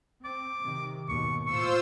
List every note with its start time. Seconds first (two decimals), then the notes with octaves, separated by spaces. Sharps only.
0.25 C4 D6
0.60 C3 D#3
1.09 D#2 G#2 B2 C#6
1.46 A2 F4 C5 C#6 E6